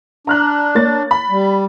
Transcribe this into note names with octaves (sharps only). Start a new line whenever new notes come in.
D4 A#5 F6 F#6
A#3 C#5 A6
B5
G3